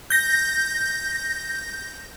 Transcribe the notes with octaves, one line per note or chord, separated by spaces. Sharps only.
G6 A#6